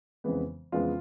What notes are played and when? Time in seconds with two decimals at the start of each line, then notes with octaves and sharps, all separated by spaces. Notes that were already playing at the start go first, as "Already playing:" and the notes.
0.24 F2 C#3 E3 G#3 B3
0.72 F2 C#3 E3 G#3 B3 F4